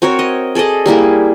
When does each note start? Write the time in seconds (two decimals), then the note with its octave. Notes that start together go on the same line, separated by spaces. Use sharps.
0.02 C4 F#4 A#4 C#5
0.19 D#5
0.55 G#4 A4 D5 D#5
0.86 G3 A#3 E4 G#4